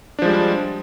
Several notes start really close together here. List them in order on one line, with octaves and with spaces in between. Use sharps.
D4 F3 G#3 G3